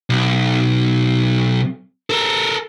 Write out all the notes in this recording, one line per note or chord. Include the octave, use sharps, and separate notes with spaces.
B1
A4 A#4